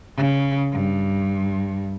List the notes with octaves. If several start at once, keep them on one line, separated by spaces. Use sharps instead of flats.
C#3
G2